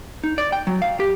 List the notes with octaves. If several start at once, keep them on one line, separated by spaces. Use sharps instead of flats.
D#4
D5
G5
F#3
F5
G4